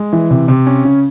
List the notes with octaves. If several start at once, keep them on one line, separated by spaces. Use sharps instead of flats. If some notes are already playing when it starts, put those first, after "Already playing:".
Already playing: G#3
E3
C3
C3
C#4
C#3